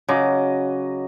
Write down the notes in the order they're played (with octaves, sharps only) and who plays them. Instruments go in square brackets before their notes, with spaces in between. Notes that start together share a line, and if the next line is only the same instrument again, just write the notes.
[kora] C#3 [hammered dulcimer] F#3 D#5 D6